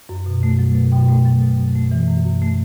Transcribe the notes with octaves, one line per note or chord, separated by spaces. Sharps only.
F#2
B2
A3
F#3
B2
B2 G5
A3
F#3
B2
F#2
A3
E3
F#2
F#2
A3